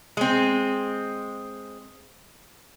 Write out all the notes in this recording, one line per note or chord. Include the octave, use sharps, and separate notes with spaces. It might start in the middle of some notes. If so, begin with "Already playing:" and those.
G#3 C4